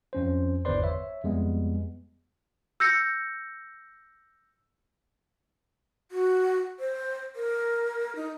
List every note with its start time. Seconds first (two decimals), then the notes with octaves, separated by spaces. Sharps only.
0.13 F2 C#4 C5
0.65 G1 E2 B4 C5 D5 C6
0.82 C#5 E5
1.23 F2 G3 G#3 B3
2.80 E6 G6 A#6 C#7
6.12 F#4
6.80 C5
7.36 A#4
8.16 D#4